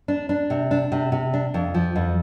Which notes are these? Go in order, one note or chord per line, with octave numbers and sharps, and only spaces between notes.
D4
D4
C3
D4
C3
C3
D4
F2
F3
F2